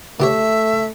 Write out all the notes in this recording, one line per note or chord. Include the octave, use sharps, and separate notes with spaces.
D3 A3 G4 C#5 E5